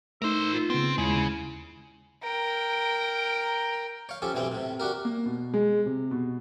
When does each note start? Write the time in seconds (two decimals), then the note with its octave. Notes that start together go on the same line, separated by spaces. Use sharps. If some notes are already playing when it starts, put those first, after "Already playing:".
0.22 A3 D#4 A#4 C5 E6
0.53 F4
0.70 C#3 B3 C4
0.98 D#2 C#3 G#3 E4
2.23 A#4 G5
4.09 C#5 F5
4.22 F3 C#4 G4 A4
4.34 B1 G2 E3 C4 G5
4.52 A2 C3
4.80 D4 F#4 G4 A#4
5.05 A#3
5.26 B2
5.54 G#3
5.86 C3
6.11 B2